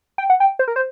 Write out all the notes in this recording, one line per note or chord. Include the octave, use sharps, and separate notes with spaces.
G5
F#5
G5
C5
A#4
C5